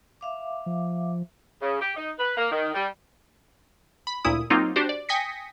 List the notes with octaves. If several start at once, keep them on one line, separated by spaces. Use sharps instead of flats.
E5 F5 D6
F3
C#3
G4
D#4
B4
A#3
D#3
G3
B5
D2 A#2 E4 D#6
F#3 A#3 C4 D#4 F4
D4 F#4 G4 C5
D5
G5 G#5 D#6 A#6 B6 C#7